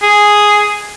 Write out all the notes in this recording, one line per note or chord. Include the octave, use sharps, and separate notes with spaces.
G#4